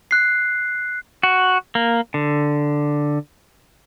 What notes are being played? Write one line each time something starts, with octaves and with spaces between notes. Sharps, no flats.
F#6 C7
F#4
A#3
D3